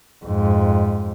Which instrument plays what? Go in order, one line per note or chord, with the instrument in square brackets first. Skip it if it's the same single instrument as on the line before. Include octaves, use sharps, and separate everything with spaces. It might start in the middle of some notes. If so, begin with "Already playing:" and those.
[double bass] F2 G#2